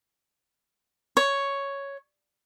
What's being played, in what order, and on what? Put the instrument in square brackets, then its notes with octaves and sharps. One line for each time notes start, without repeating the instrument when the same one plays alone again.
[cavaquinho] C#5